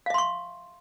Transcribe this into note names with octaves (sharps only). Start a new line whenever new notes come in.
E5 F5 C6 C#6